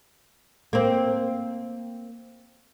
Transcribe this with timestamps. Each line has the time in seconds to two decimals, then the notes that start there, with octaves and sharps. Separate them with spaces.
0.73 A#3 C4